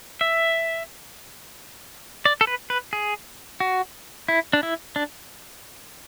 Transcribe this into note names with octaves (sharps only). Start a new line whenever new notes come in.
E5
D5
A4
B4
B4
G#4
F#4
E4
D4
E4
D4